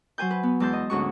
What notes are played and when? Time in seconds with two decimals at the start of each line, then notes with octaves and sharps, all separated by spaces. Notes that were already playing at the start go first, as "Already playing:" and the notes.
0.18 F#3 C5 G#5 G6
0.31 B4
0.43 B3
0.60 E2 G#3 A5 C6 G6
0.73 D#5
0.90 D2 G#2 C#4 F#4 C#6